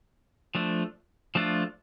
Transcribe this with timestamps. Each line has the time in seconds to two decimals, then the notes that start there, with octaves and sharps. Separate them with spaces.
0.55 F3 A3 D4
1.35 F3 A3 D4 F4